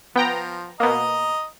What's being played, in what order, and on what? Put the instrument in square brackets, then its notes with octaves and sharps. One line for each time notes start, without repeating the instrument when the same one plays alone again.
[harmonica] F3 [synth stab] B3 G5 A#5
[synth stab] B2 A#3 [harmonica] D#5 A#5 D#6